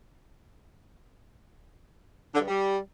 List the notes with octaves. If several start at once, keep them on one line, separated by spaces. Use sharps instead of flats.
D3
G2
G3